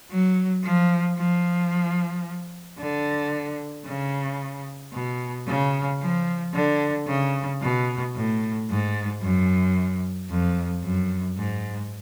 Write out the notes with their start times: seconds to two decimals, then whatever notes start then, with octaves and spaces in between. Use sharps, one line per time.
0.10 F#3
0.64 F3
1.17 F3
2.79 D3
3.85 C#3
4.93 B2
5.47 C#3
6.01 F3
6.54 D3
7.07 C#3
7.62 B2
8.15 A2
8.69 G#2
9.22 F#2
10.30 F2
10.83 F#2
11.37 G#2